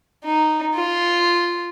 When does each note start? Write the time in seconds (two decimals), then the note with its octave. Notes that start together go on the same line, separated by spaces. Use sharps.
0.25 D#4
0.76 F4